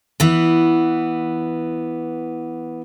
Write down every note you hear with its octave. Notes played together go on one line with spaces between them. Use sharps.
E3 B3